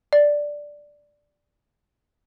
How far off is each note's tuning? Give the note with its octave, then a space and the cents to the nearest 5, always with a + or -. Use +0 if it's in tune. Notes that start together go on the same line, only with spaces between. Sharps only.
D5 +0